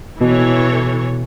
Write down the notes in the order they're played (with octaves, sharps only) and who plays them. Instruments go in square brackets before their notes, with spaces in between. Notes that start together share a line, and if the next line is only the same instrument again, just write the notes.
[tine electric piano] B2 [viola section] E3 A4 C#5